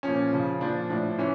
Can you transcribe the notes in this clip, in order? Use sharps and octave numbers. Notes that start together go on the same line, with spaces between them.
A#2 F3 C#4
C#3 F3
A#2 F3 D4
A2 F3 D4
E3 C#4